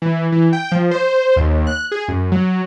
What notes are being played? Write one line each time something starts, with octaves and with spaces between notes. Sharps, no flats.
E3
E3
G5
F3
C5
D#2
F#6
G#4
F#2
F#3